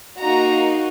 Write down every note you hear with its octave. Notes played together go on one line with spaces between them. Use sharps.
A#3 D#4 F#4 A#5